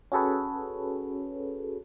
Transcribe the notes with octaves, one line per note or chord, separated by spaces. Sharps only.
C#4 F#4 G#4 A4 B4 C#5